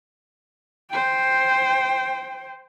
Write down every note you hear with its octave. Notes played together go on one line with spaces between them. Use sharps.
C5 G5